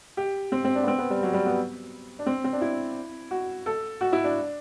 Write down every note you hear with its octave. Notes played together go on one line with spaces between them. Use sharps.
G4
C4
C4
D4
B3
C4
B3
G3
F#3
G3
B3
D4
C4
C4
D4
E4
F#4
A4
F#4
E4
D4